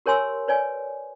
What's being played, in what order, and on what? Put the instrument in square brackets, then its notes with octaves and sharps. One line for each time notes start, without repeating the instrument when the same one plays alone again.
[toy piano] G4 A#4 C#5 G#5 C6 E6
B4 C#5 D5 G#5